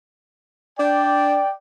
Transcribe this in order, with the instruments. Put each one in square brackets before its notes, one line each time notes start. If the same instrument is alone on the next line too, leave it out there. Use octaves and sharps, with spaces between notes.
[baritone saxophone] D4 [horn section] D5 G5